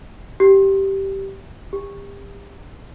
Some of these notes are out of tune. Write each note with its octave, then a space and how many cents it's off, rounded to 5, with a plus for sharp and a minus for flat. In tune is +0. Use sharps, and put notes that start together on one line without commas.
G4 -10
G4 +35